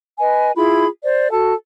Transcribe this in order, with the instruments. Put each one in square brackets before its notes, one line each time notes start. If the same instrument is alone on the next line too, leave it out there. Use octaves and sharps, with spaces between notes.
[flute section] B4 D#5 G#5
E4 F4 G#4 B5
C5 D5
F#4 A4 A5